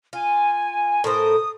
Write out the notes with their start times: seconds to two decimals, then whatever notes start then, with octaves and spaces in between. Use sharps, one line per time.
0.13 F4 G#5
1.04 A2 A#4 C5 D#6